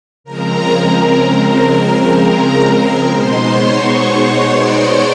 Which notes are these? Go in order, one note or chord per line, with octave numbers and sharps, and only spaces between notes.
C#3 F3 G#3 C4 A#4 A#5
B2 G#3 B3 D#4 C5 C6
C#5 C#6
C#5 C#6
D5 D6